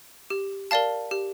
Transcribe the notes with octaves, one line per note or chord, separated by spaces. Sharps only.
G4
A#4 D5 F5 A5
G4